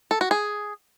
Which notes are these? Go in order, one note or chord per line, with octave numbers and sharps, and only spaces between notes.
A4
F#4
G#4